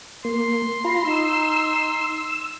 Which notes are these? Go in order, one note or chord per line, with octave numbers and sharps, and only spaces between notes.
A#3 C6
F4 A#5 B5
D#4 E6